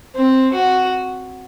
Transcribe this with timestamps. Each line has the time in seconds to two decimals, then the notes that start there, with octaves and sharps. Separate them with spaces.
0.15 C4
0.53 F#4